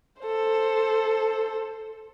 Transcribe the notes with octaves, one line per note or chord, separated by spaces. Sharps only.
A4 C5